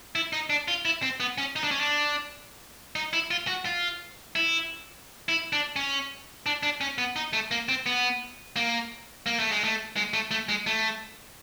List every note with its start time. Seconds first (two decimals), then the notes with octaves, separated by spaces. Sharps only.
0.15 E4
0.33 D#4
0.50 D4
0.68 F4
0.85 E4
1.03 C4
1.20 B3
1.38 C#4
1.56 D#4
1.63 D4
1.71 C#4
1.80 D4
2.96 D#4
3.13 E4
3.31 F4
3.47 F#4
3.66 F4
4.36 E4
5.29 E4
5.53 D4
5.76 C#4
6.46 D4
6.63 D4
6.81 C#4
6.98 B3
7.16 D#4
7.33 A3
7.51 A#3
7.69 C4
7.86 B3
8.56 A#3
9.26 A#3
9.39 A3
9.52 G#3
9.64 A3
9.96 G#3
10.14 A3
10.31 A3
10.49 G#3
10.67 A3